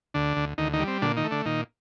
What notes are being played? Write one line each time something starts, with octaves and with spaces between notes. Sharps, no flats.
D2 D3 D4
D2
D2 D#3 D#4
D#3 D#4
G3
C4
A#2 D3 D4
D#3 D#4
A3
D3 D4
A#2 D#3 D#4